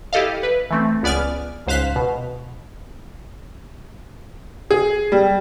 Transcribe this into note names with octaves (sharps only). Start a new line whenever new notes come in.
E4 G4 A4 D#5 F5
B4
E3 A3 C4
C#2 B3 D5 G#5 F6
C#2 G#2 C5 F5 F#6 B6
B2
G#4
G3